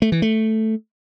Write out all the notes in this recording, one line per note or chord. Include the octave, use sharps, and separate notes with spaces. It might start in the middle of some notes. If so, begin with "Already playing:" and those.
A3
E3
A3